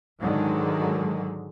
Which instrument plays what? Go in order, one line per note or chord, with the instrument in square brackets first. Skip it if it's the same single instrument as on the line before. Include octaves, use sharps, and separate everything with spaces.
[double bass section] G#2 D3 D#3 F#3 G#3